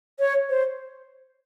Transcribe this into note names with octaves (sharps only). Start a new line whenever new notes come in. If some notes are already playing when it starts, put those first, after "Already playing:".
C#5
C5